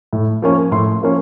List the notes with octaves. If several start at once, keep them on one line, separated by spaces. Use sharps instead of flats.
A2
F3 A#3 C#4
A2 C6
F3 A#3 C#4